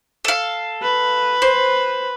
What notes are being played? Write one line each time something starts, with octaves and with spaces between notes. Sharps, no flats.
A4 F5
B4
C5